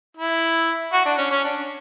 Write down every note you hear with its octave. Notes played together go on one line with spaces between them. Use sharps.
E4
F#4
D4
C#4
C#4
D4